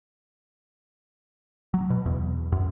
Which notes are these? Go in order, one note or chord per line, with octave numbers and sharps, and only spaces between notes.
F#3
B2
E2
F#2